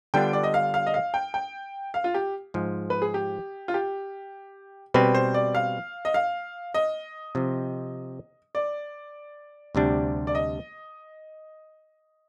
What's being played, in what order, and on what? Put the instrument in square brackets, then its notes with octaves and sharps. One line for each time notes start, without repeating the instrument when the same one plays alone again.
[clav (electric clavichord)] D3 G3 B3 D4 F4 [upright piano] G5
[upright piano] D5
D#5
F5
F5
D#5
F5
G5
G5
F5
F4
G4
[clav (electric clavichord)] G#2 F3 G#3
[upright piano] B4
G#4
G4
F4
G4
[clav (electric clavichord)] B2 G3 C4 [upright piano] B4
[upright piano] C5
D5
F5
D#5
F5
D#5
[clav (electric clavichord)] C3 F3 C4
[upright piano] D5
[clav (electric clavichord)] D2 C3 G3 D4
[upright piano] D5
D#5